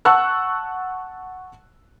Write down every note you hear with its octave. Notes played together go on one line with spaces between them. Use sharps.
F#5 A5 C#6 E6 F#6